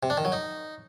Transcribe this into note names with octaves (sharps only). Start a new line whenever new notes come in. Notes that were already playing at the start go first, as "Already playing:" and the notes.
C3
D4
D#3
F#3
D#4